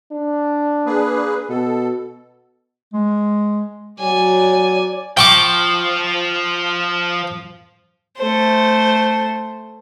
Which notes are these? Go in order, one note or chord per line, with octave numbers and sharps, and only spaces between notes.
D4
A#3 G#4 B4
B2 A4
G#3
F#3 C#5 D5 G#5
F3 G5 C#6 D6
A3 C5